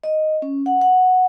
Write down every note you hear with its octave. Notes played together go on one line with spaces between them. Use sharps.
D#5
C#4
F#5
F#5